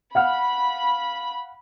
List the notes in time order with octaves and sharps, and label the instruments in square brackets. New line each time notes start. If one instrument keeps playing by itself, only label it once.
[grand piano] F5 F#5 F6 [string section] B5